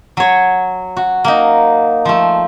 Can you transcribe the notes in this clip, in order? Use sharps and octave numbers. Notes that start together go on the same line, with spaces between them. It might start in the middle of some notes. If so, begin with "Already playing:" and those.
F#3 C#5
F#4
A#3 D#4
F3 A3